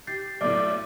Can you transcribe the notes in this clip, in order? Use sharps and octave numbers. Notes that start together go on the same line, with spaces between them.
G4 G6 A6 C7
B1 A2 D5 D6